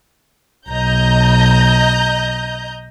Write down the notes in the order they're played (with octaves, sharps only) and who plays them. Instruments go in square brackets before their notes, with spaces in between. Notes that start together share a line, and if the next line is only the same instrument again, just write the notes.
[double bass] B1 [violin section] D#5 A#5 G6